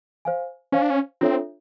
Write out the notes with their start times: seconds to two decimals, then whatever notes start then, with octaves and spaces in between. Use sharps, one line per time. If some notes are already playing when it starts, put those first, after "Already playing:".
0.25 C5 F5 G#5
0.72 C#4 C5 F5 G#5
0.82 D4
0.90 C#4
1.21 C4 D4 F4 A4 C#5 E5